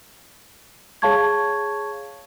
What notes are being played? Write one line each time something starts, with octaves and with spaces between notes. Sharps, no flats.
G#4 C#5 F5 A5 C#6 G#6